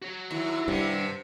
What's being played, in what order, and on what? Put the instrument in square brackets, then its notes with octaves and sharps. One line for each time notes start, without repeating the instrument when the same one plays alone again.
[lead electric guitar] F#4 C#5
[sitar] D#2 [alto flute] E4
[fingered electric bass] G2 [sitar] C3 [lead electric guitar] D5 F#5